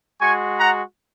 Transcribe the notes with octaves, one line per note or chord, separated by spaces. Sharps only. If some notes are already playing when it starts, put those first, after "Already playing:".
G#3 F#4 G#5 C#6
F#5 A#5